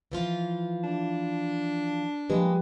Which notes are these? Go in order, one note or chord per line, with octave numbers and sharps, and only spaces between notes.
E3 F3 F4
D4
F3 G#3 A#3 G4 B4